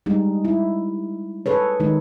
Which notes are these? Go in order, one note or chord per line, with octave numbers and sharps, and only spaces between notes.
G3 G#3 D#4
E4
G#4 A4 B4 C#5
D#3 G#3 D#4